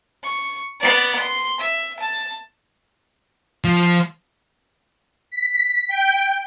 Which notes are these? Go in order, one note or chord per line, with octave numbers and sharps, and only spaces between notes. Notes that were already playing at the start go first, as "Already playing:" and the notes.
C#6
B3 D5
C6
E5
A5
F3
B6
G5